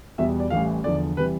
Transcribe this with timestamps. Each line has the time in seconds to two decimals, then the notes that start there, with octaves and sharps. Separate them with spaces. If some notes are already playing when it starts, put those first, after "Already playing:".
0.18 E2 B2 G3 E5
0.40 D5
0.50 A1 A2 E3 G3 F5
0.84 E2 D3 F3 D5
1.17 C3 E3 G3 B4